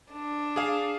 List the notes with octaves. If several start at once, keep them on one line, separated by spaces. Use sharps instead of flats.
D4
G#4 F5